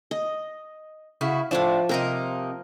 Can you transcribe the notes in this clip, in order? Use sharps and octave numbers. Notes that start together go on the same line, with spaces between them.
D#5
C#3 E4 F#4
A2 F3 D4 D5 A5
C3 A#3 D#4 A#4 A#5